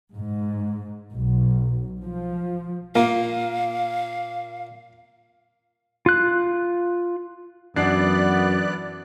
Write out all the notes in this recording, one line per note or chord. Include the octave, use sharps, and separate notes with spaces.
G#2
B1
F3
A#2 A#3 F5
F4 F#6
F#2 E3 B3 D4 D5 F#6 C7